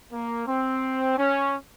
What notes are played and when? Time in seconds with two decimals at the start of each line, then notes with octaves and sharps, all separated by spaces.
0.12 A#3
0.47 C4
1.18 C#4